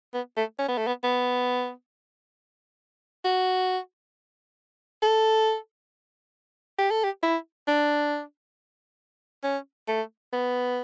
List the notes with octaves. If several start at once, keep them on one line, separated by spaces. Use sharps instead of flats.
B3
A3
C#4
B3
A3
B3
B3
F#4
A4
G4
A4
G4
E4
D4
C#4
A3
B3